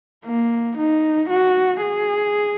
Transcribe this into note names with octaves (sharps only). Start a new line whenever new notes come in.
A#3
D#4
F#4
G#4